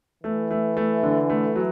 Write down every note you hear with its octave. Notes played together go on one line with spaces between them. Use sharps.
E3 A3
A3
A3
D3
A3
F#3